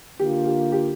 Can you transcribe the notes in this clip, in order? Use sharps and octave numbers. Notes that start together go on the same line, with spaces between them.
D3 A#3 F4 G4
G4
G4